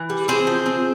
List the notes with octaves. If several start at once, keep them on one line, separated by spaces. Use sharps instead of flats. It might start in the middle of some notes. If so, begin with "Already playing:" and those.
Already playing: E3
G3
C4 G#4 C5
F3
C4